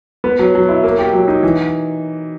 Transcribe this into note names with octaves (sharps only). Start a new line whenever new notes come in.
B3
F#3
F#3
E4
A#3
G4
F#3
D#4
E3